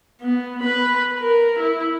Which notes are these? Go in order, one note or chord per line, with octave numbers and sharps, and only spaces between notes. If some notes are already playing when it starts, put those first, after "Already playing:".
B3
B4 B5
A#4
E4